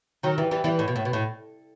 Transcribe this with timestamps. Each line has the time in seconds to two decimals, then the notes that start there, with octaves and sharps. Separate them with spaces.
0.23 D#3 F#3
0.38 E3 G3
0.51 E3 G3
0.64 E3 G3
0.79 A2
0.88 B2
0.96 A2
1.05 B2
1.13 A2